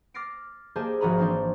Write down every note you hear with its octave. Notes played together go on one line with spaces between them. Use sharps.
D6 F6 A6 A#6 C7 D7
A#3 G4 G#4 C5 D#5 A5
G#1 F3 F#4 D#5 A#5 B5
E3 C4 D4 D#4 C5